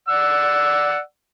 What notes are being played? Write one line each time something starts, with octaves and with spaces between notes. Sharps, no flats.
D5 F#5 E6